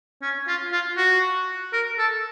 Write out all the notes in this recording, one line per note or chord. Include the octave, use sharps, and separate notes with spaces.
C#4
F4
F4
F#4
A#4
A4